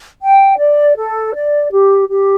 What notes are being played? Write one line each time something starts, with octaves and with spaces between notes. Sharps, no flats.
G5
D5
A4
D5
G4
G4